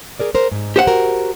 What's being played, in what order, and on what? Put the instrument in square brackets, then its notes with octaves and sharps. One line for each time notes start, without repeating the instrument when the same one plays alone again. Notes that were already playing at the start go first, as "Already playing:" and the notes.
[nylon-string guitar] G#4 A#4 D5
A#4 C5
G#2
[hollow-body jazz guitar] G4 C5 F#5
[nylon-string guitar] F#4 A#4